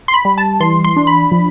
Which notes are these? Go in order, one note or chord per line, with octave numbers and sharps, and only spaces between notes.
C6
B5
G3
A5
E3 C6
C6
D4
B5
F3